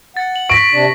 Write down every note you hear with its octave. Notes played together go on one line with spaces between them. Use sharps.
F#5 A6
F#7
C#6 A#6 B6 D7
C3 D4